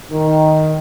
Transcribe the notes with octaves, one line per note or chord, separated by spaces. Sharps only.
D#3